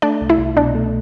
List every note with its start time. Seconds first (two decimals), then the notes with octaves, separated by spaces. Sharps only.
0.02 A3 D4 D5
0.21 C2
0.29 E4 E5
0.38 C2
0.56 B2 D4 D5
0.75 A3